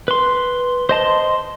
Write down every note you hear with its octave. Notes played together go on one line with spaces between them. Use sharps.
B4 C6
C5 D#5 A5 C6